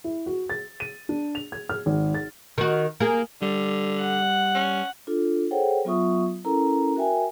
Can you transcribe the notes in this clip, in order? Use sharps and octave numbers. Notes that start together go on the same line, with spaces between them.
E4
F#4
A6
D#7
D4
F7
G#6
F6
G#1
A6
D#3 F#4
A#3 G#4
D3 G3
F#5
C#4
D4 F4 A4
G#4 A4 C5 C#5 F#5 G5
F#3 B3 F4 E5 C#6 D#6
C#4 E4 A4 A#4 A#5
F#4 A#4 E5 G5 G#5